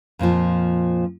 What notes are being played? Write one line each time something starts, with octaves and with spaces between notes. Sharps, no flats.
F2 A#2 E3 F3